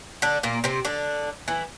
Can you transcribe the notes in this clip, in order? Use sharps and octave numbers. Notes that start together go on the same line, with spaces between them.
D3 D4
A#2 A#3
C3 C4
D3 D4
E3 E4